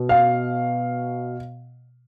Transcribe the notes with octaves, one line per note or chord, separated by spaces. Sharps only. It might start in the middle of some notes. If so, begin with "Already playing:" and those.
Already playing: B2
F5